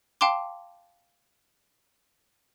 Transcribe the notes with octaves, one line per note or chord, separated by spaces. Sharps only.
F5 G5 A5 C6 D6